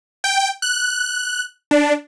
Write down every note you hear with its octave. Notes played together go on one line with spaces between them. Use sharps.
G5
F#6
D4